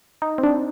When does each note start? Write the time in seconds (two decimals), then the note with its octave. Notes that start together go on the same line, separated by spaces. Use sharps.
0.22 D#4
0.38 C4
0.43 D4